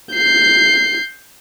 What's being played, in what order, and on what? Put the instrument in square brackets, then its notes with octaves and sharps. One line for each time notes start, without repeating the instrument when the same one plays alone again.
[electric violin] G6 C7